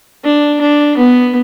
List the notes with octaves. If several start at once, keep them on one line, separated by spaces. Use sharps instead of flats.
D4
D4
B3